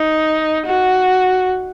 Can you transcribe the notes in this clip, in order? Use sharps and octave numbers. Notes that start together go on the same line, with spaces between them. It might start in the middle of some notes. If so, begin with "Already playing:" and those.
Already playing: D#4
F#4